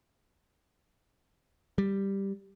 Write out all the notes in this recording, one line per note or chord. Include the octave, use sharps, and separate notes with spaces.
G3